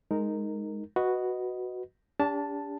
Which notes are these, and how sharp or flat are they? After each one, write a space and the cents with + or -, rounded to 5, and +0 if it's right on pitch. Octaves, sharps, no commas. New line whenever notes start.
G#3 +0 D#4 +0 A#4 -10
F#4 +0 B4 +0 D#5 +0
D4 -35 G4 +35 A5 +0